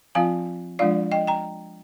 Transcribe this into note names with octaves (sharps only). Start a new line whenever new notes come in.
F3 C4 F4 F5 G#5
F3 G#3 D4 F4 D5 F5
D#5 G5
G5 A#5